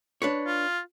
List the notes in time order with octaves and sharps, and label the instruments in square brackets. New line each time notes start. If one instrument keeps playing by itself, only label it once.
[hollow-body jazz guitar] D4 B4 C#5
[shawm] F4